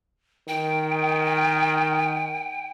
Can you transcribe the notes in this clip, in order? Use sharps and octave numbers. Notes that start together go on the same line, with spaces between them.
D#3 G5